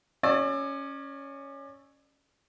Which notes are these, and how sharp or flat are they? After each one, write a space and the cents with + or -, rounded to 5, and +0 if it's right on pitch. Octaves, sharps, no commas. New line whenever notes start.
C#4 +0 D5 +35 E6 +0